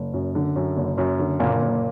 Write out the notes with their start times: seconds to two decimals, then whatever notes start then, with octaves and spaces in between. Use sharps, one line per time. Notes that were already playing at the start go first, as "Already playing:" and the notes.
Already playing: F#1
0.13 F#2
0.35 D3
0.56 F#2
0.77 F#1
0.98 F#2
1.19 D3
1.40 F#1 A#2 A#3
1.62 F#1